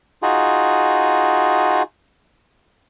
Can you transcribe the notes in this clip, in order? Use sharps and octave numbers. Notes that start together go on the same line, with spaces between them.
D#4 F4 F#4 G#4